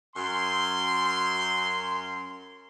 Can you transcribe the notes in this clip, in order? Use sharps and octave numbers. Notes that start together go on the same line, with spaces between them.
F#2 C6